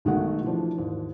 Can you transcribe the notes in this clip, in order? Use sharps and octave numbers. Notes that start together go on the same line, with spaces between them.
B1 D#3 G#3 A3 F#4 F#5
E3 F3 D4
D#2 G#2